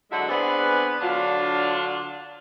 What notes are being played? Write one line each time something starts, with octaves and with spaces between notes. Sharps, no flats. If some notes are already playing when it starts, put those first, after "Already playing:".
D3 F#3 G#3 E4 F#4
B3 C4 D4 G#4 B4
D3 F#3 D4 F4